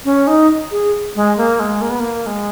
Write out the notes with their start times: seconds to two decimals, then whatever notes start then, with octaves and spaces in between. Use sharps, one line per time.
0.05 C#4
0.27 D#4
0.71 G#4
1.15 G#3
1.37 A#3
1.60 G#3
1.81 A#3
1.90 B3
2.00 A#3
2.26 G#3